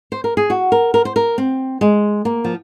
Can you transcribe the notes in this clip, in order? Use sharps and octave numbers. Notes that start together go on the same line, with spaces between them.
C5
A#4
G#4
F#4
A#4
A#4
C5
A#4
C4
G#3
A#3
F3